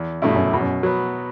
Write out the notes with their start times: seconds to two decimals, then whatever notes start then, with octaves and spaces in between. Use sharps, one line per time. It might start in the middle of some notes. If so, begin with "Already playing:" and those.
Already playing: E2
0.22 G2 B2 A3 E4
0.35 F#2
0.47 E2
0.53 B2
0.60 F#2
0.83 F#3 B3